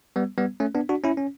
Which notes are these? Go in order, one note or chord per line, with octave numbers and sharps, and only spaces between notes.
G3 B3
G3 B3
A3 C#4
B3 D4
D4 F#4
C#4 E4
C#4